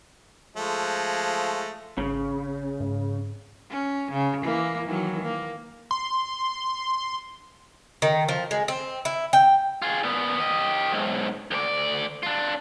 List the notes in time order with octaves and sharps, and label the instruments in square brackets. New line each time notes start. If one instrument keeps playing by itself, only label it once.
[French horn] F3 [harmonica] G#3 A3
[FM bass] G#1 [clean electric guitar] C#3
[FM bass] G#2
[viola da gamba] C#4
C#3
E3 A#3
D#3 E3 F#3
A#3
[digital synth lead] C6
[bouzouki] D#3
F3
G#3
C4
E4
G5
[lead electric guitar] F4 G#4
A#2 B3
G4 D#5
B1 G#2
D2 D5
D4 F4